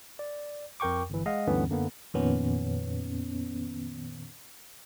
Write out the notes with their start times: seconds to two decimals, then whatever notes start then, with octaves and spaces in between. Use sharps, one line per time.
0.19 D5
0.80 F2 A#4 G5 C#6 D6
1.10 G1 E3
1.26 G#3 D#5 F5 F#5
1.48 D2 G2 D3 E3 B3 C#4
1.69 F#2 D3 A#3 B3
2.14 F2 A#2 D#3 B3 C#4